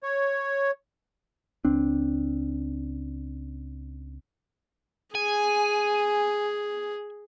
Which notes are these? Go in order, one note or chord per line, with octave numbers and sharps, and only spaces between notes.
C#5
C#2 C4 D4
G#4 G#5